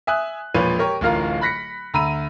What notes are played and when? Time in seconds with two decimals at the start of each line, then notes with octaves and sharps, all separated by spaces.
0.07 E5 G#5 D#6 F#6
0.54 E1 A#2 F3 B4 C#5 D#7
0.79 G4 A#4 C#5
1.01 D1 A1 F4 A#4 F5 A#5
1.41 B5 F#6 A#6 B6 C#7
1.94 D2 A#5 B5 E6 D#7